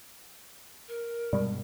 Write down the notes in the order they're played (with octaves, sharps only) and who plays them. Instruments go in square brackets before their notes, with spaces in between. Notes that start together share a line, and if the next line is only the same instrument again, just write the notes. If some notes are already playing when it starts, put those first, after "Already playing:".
[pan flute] A#4
[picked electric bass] G2 B2 G#3 [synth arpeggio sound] G3